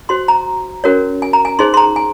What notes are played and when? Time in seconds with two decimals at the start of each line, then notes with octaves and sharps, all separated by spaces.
0.09 F#4 C5 C6
0.28 A#5
0.84 C#4 F#4 A#4 C#5
1.22 G#5
1.33 A#5
1.45 G#5
1.59 D#4 G#4 C5 C6
1.74 C6
1.77 A#5
1.96 G#5